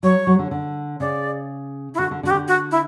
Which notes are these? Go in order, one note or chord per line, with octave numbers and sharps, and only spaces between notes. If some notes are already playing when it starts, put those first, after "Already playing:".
F#3 C#5
F#3
D3
D3
C#3 D5
E4
D3 F#4
D3
D3 F#4
G4
D3
F#4
E4